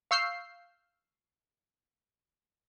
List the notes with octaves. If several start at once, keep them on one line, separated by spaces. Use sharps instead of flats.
F5 C#6 E6 F6 G6 C7